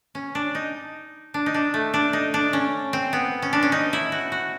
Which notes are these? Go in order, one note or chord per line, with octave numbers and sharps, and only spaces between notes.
C#4
D4
D#4
D4
D#4
D4
A3
D4
D#4
D4
C#4
C4
B3
C#4
D4
C#4
D#4
E4
F#4
F#4